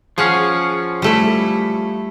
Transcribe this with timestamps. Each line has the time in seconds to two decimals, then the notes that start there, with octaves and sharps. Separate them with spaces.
0.18 F3 C#4 G#4 F5 F#5
1.02 G3 A3 E4